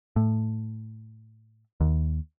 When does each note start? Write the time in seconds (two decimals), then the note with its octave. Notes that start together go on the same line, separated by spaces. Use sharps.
0.16 A2
1.81 D#2